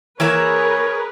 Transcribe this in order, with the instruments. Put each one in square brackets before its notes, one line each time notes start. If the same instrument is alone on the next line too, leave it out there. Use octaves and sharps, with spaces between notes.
[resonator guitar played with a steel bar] E3 A#3 E5 [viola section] G#4 A#4 B4 [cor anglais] C#5